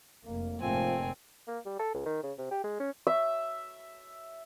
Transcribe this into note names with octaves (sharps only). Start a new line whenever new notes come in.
F1 A#3
F1 G#2 F3 A3 A#3 C4 G#5
A#3
G3
A4
C#2
D#3
C#3
C3
G4
G#3
C#4
E5